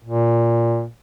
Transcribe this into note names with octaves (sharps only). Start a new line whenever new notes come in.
A#2